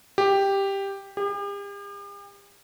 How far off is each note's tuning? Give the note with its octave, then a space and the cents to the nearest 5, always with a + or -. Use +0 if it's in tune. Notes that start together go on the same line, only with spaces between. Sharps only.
G4 +5
G4 +45